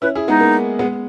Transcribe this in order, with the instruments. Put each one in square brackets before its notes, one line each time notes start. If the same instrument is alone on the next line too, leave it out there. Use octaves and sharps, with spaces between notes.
[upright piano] C#4 E4 [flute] B4
[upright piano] E4 G#4
[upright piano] G#3 B3 [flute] D#4
[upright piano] A#3
G#3 B3